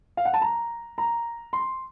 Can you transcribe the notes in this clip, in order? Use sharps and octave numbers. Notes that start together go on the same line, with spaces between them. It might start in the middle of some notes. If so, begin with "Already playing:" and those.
F5
F#5
A5
A#5
A#5
C6